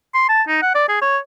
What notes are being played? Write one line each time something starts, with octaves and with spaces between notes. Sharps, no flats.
C6
A5
D#4
F#5
D5
G#4
C#5